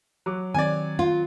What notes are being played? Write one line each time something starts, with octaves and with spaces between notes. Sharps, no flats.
F#3 D6
D#3 C4 D5 G#5
F4